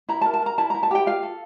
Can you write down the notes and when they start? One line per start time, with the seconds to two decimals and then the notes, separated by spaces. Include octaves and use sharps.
0.09 E4 A#5
0.21 A5
0.26 A#4
0.34 A5
0.42 A#4 A#5
0.58 E4 A5
0.70 A#5
0.74 E4
0.83 A5
0.91 G4 G5
1.06 F4 F5
1.23 A4